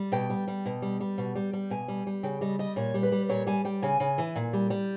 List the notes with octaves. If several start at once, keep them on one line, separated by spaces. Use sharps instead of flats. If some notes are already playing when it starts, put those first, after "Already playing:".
Already playing: G3
B2 G5
G3
G3
B2
G3
G3
B2
G3
G3
B2 G#5
G3
G3
C#3 G5
G3 D#5
G3 D#5
A#2 C#5
G3
B4
G3
A#2 C#5
G3 G#5
G3 G5
C#3 G#5
C#3
E3
A#2
G3
G3